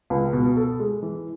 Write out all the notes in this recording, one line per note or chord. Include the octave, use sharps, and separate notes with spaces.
C#2
B2
A4
G#3
E3